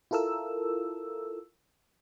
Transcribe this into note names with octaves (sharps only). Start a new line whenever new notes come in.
E4 F4 A4 A#4 E6